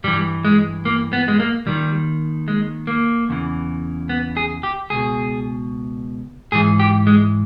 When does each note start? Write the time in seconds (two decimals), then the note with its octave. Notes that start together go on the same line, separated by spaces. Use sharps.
0.04 G2 E3 G3
0.45 G#3
0.85 A#3
1.13 B3
1.28 G#3
1.40 A#3
1.66 D#2 D#3 G3
2.48 G#3
2.87 A#3
3.29 E2 C#3 E3
4.09 B3
4.37 G#4
4.63 G4
4.90 C#2 B2 G#4
6.52 G#2 E3 G#4
6.80 G4
7.07 G#3